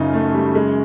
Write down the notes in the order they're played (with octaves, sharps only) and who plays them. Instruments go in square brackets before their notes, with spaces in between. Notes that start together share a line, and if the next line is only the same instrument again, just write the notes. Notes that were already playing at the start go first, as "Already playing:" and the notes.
Already playing: [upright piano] F#2 C#3 [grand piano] D#4 F4
[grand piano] A3
G3
G#3